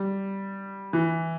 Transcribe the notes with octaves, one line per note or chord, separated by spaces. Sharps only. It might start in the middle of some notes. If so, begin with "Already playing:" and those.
Already playing: G3
E3